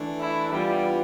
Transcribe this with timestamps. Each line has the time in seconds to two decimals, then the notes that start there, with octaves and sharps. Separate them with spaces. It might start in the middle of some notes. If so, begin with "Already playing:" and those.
Already playing: E3 A3 D4
0.20 E4
0.52 E3 G3 B3 D4 F4